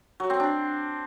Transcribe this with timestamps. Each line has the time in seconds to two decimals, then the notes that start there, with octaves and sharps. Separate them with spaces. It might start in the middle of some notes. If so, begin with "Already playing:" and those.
0.20 F#3
0.30 C4
0.40 D4